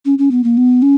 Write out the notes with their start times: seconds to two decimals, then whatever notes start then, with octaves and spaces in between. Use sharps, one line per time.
0.05 C#4
0.18 C#4
0.31 B3
0.44 A#3
0.57 B3
0.82 C#4